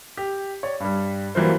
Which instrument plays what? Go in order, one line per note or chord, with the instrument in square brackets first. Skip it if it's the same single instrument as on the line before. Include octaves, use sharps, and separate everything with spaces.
[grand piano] G4
C#5 D5
G2 G3
E3 F#3 G3 A#3 F4 C5